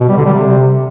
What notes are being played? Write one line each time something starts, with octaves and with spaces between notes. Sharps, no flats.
B2
G3
D3
G3
C3